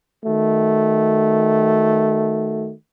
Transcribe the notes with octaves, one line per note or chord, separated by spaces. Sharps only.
D#3 A3 F#4